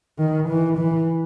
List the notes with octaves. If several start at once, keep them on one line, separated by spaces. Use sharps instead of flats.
D#3
E3
E3